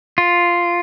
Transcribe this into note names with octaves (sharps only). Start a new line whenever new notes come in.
F4